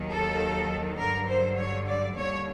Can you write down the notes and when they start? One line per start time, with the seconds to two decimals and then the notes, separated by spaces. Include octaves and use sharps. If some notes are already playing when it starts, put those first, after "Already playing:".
Already playing: D#2 D#3 F#3
0.11 A4
0.98 G2 D3 F#3 A#4
1.28 C5
1.57 C#5
1.87 D5
2.16 D#2 D3 G3 C#5